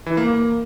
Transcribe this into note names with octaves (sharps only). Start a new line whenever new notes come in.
E3
A#3
A#3